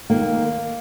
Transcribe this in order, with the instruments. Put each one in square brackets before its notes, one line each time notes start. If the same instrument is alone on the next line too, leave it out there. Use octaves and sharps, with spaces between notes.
[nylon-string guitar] D#2 D#3 A#3